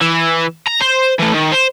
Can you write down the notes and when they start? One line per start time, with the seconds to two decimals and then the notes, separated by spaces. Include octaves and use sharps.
0.02 E3
0.68 A#5
0.81 C5
1.19 E3 A3
1.34 D#3
1.52 C5